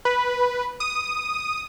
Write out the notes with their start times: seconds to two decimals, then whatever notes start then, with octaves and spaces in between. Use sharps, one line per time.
0.05 B4
0.80 D#6